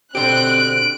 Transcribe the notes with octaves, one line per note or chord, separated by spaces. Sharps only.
B2 D3 C4 G4 F#6 D7